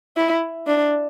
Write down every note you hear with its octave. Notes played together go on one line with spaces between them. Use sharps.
E4
D4